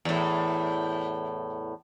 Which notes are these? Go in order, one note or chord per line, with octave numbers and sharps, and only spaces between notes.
E2 A2